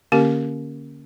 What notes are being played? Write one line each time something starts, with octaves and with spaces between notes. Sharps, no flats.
D3 A#3 C#4 G4 A#4